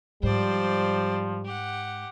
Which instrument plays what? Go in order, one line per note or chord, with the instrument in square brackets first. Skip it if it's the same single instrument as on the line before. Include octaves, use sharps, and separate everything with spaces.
[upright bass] G#2 [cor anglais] F3 [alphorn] G3 [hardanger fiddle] C5 D5
[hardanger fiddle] G4 F#5